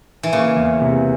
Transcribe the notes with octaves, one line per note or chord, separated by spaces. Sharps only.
E3
C#3 A#3
E2
C3